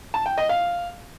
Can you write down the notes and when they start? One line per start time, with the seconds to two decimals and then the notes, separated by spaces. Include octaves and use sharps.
0.14 A5
0.26 G5
0.38 D#5
0.49 F5